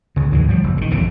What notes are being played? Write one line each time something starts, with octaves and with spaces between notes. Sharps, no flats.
C#2 C#3
D2 G#2 E3 G#3
F3 G3
F#1
G2 D#3
A#1 F2 C#3 E3